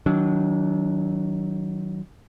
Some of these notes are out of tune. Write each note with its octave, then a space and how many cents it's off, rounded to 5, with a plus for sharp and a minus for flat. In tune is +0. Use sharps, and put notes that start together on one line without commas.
D#3 +25 F#3 +15 D4 -20